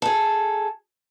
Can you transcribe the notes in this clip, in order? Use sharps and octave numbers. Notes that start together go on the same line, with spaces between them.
G#4 A4